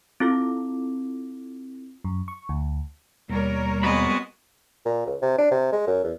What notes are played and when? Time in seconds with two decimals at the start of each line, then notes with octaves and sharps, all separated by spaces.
0.20 C4 E4 F4 A4 D6
2.04 F#2
2.28 C#6
2.49 D2
3.29 D#2 B2 G3 A#3 A#4 C#5
3.83 G#3 B3 C4 F#4 D#5 B5
4.85 A#2
5.06 C#2
5.22 C3
5.38 D4
5.51 C3
5.72 G#3
5.87 F#2
6.03 E2